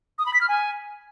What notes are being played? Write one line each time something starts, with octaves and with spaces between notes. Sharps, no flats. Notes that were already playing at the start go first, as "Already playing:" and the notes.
D#6
B5
B6
F6
G#5